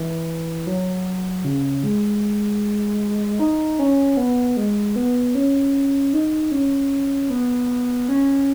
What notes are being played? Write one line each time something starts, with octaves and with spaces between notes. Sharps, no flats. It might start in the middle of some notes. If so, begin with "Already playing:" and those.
Already playing: E3
F#3
C#3
G#3
D#4
C#4
B3
G#3
B3
C#4
D#4
C#4
B3
C#4